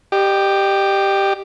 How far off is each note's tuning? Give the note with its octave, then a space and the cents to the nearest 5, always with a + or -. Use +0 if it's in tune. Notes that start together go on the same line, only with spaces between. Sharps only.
G4 +0 D#5 -40